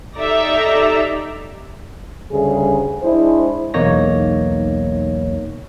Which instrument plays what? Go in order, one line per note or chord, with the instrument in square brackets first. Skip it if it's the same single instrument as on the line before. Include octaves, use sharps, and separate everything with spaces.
[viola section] D#4 G4 A4 D5 E5 A#5
[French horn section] D2 C#3 G3 G#4
G#3 D4 E4 C5
[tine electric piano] B1 E2 A#3 D#4 C#5 A#6